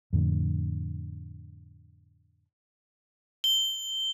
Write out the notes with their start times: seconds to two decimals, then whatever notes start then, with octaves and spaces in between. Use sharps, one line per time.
0.13 F2 A2 D3
3.44 G7